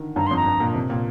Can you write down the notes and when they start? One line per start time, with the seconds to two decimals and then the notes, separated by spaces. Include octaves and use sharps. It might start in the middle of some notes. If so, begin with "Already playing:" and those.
Already playing: D3 D#3
0.16 G2 A#5
0.27 F2 C6
0.36 A#5
0.46 G2
0.60 A#2
0.74 C3
0.90 A#2